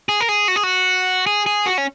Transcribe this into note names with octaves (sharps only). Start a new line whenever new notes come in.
G#4
A#4
G#4
F#4
G#4
F#4
G#4
G#4
F#4
C#4